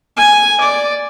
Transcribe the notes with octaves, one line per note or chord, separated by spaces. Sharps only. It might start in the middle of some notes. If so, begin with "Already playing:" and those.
G#5
D5